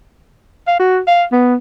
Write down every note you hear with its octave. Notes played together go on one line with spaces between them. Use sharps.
F5
F#4
F5
B3